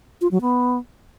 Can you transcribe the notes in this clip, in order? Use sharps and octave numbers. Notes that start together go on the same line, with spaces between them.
F4
F#3
B3